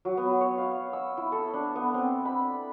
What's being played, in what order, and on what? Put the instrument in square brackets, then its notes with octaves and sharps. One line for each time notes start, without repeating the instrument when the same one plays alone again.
[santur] F#3
B3
C#5
F5
E6
E4
A4
D4
B3
C4
B5